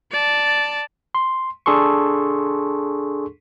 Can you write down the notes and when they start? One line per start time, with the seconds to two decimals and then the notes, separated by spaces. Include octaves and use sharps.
0.12 D5 A5
1.15 C6
1.66 D4 G#4 A4 C6 C#6